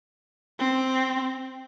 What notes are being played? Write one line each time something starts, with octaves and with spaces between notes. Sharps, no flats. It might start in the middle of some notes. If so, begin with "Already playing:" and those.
C4